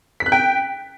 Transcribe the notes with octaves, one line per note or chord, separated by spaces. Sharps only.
B6
F#6
G5